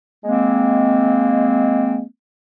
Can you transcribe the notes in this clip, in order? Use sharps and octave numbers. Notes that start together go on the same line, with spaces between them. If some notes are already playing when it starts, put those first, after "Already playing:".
G#3 A#3 C4